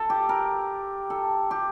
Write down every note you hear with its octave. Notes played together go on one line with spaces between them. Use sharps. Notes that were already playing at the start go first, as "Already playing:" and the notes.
Already playing: A4
G4
A#4
A4
G4